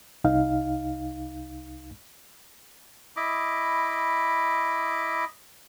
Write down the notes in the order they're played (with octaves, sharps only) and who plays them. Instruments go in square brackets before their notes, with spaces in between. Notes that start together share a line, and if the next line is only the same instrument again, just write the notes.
[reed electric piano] C2 D#4 F5
[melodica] E4 D#5 B5 D6